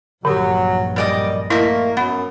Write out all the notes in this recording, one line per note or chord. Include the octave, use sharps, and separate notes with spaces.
A#1 G2 D3 F#3 G4
F#2 G3 D5 D#5
A3 A#3 E4 D#5 E5
F#2 B3